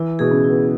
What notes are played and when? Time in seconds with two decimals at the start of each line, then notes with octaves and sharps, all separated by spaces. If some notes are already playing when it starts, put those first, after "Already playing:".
Already playing: E3 E4
0.19 B2 G#4
0.31 C#3
0.44 E4
0.50 B3